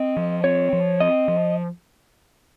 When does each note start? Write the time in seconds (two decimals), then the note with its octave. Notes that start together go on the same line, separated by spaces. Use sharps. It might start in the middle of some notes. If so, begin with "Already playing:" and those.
Already playing: C4 D#5
0.16 F3
0.44 C4 C#5
0.73 F3
1.00 C4 D#5
1.28 F3